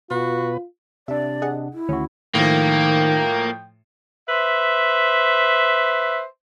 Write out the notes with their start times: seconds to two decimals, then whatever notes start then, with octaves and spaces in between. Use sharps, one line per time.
0.11 B2 F4 F#4 B4
1.08 C3 D4 D5 E5
1.42 G#4 D#5 F#5
1.73 E4
1.89 D2 D#3 C#4 F#4
2.35 A2 D#3 F3 A#3 G5
4.29 B4 C5 E5